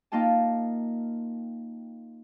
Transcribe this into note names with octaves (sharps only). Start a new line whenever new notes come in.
A#3 D#4 F4 G5 A5